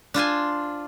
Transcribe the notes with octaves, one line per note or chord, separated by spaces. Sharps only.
D4 F4 C5 G#5